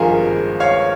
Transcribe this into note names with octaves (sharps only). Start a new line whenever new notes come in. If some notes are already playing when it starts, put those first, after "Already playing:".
Already playing: G#1 G2 F3 G#3 F4 G#4 A#4
C#5 F5